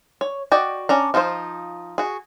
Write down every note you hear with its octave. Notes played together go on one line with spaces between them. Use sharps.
C#5
F#4 D5 D#5 G5
C#4 D4 A#5
F3 D#4 F4 A4 C5
F#4 G#4